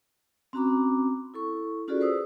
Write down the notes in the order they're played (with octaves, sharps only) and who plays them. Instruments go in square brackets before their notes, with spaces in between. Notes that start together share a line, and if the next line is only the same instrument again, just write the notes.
[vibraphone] C4 C#4 F#4 A#5 B5 D6
E4 A4 C#6
C#4 F4 F#4 G#4 A4 D5
G#4 B4 C5 D#6 E6